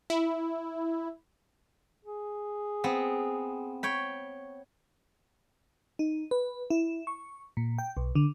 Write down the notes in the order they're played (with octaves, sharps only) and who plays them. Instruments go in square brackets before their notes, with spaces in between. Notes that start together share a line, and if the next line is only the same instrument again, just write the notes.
[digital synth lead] E4
[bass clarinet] G#4
[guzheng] B3 C4
C#5 G5 B5
[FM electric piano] D#4
B4
E4
C#6
A#2
G5
B1
D3